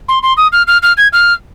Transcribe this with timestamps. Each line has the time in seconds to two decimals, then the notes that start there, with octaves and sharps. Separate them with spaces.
0.09 C6
0.23 C6
0.37 D#6
0.52 F6
0.68 F6
0.83 F6
0.98 G#6
1.13 F6